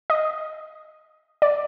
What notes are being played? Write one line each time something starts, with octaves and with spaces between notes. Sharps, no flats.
D#5
D5